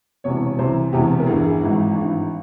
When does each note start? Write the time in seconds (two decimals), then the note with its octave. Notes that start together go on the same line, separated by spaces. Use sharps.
0.24 E1 E2 C3 C#5
0.59 C2 C3 E3 C5
0.93 E1 E2 C3 E3 G4
1.20 A#4
1.26 G1 G2 E3 G#4
1.44 G#4
1.61 G#1 G#2 E3
1.95 G#1 G2 E3